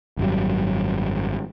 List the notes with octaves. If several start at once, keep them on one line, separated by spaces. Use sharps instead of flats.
G#1 F#2 F#3 G3